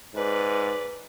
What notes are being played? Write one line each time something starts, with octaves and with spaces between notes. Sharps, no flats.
G#2 B4 D5